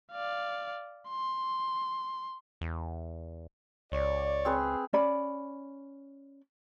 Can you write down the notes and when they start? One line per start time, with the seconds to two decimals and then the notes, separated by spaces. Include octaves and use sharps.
0.12 D5 F5
1.09 C6
2.61 E2
3.92 C#2 C#5 D5
4.45 C4 G#4 B4
4.93 C#4 D5 B5